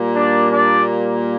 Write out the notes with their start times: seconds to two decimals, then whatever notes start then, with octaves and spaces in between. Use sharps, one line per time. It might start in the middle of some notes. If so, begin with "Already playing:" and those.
Already playing: A#2 G3 A#3
0.15 D4 D5
0.51 D4 D5